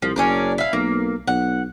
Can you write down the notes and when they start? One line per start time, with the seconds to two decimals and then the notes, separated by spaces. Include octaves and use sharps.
0.02 C2 F3
0.16 F#1 C#4 D4 A#4
0.58 E4 F5
0.73 B1 A#3
1.27 B1 F#5